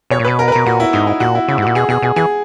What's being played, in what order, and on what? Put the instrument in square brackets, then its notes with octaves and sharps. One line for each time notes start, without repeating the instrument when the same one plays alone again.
[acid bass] B2 [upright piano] C#5
[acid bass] A#2
[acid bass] B2 [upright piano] B4
[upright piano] A#4
B4
[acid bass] B2 [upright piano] A#4
[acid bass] A#2 [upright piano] F#4
[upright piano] E4
[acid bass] G#2 [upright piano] D#4
[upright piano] E4
[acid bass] A#2 [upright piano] F#4
[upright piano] E4
[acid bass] C#3 [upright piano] E4
[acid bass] G#2
[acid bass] A#2 [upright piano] F#4
[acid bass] B2 [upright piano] G#4
[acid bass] B2 [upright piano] G#4
[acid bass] B2 [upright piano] G#4
[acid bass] E3 [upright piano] G#4